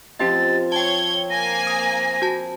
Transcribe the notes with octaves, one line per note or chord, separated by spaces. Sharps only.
F3 C4 C#4 G4 D#5 A6
C#5 G5 A5 G#6 G7
A#3 G#5 A#6
D#6
F#4 A5